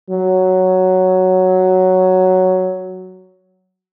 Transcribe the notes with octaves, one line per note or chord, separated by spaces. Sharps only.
F#3